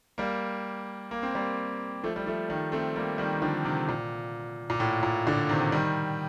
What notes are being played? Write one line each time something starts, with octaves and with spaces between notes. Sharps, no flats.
G3 A#3
A#3
C4
G3 A#3
F3 A3
G3
F3 A3
D#3 G3
A3 C4
G3 A#3
D#3 G3
D#3
D3 F3
C3 D#3
A#2
A#2
A2
A#2
A#2 D3
C3 D#3
D#3 G3